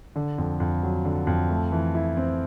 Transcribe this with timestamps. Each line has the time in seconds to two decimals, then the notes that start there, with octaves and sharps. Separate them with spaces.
0.16 D3
0.38 F2
0.60 F2
0.83 F#3
1.05 D3
1.27 F2
1.49 A3
1.72 E3
1.95 E4
2.17 C4